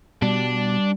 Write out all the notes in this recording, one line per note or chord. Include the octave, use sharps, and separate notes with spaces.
B2 G3 D4